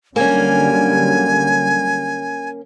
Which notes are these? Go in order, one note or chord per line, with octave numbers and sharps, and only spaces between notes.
D3 F#3 G3 A#3 C#4 G#5